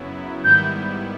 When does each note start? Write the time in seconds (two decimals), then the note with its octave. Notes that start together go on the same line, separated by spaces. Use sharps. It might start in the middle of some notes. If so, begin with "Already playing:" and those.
Already playing: F#2 C#3 F#3 B3 E4
0.44 G#2 D#3 G3 B3 E4 G6